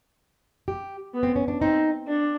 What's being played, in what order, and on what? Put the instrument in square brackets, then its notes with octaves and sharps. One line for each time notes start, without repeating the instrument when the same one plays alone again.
[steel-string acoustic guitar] G4
[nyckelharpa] B3
[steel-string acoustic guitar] C4
C#4
D4
[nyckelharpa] C4 [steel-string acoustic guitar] D#4
[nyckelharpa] D4